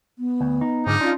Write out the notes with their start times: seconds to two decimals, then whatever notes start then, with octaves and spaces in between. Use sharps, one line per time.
0.19 B3
0.41 D2
0.61 D#4
0.86 F2 G#2 D3 F3 D#4
1.00 C#4 D4 F4